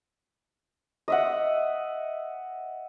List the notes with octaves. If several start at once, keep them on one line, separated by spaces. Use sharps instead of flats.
D#5 E5 F#5